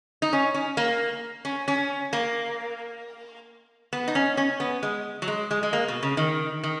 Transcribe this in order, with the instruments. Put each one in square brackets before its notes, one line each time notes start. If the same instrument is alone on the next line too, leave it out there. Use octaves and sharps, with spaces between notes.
[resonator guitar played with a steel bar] D#4
C#4
C#4
A#3
C#4
C#4
A#3
B3
D#4
C#4
C#4
B3
G#3
F#3
G#3
G#3
G#3
A#3
B2
C#3
D#3
D#3